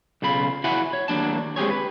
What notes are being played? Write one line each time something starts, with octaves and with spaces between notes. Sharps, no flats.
B1 C#3 F4 B5
E4 F#4 E5 F#5 G#5 B5
C#5
D#2 F#3 G#3 D4 A5
G#3 C4 G4 G#4 C#5
B4